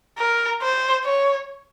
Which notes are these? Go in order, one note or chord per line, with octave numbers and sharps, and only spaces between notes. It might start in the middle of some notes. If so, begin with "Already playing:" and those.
A#4
C5
C#5